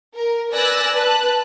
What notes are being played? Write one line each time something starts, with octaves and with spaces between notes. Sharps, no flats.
A#4
B4 D5 G#5 E6 F#6 A#6
B4 A5 F#6